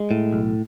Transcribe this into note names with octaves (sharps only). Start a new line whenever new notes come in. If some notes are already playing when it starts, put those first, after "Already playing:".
Already playing: G#3
A2
B1